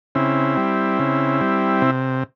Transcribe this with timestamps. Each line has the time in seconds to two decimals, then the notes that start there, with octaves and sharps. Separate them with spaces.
0.15 C#3 C4 E4
0.57 G3
0.99 C#3
1.41 G3
1.82 C3